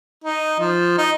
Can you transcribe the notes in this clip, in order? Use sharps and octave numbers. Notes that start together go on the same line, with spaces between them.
D#4
F3
D#4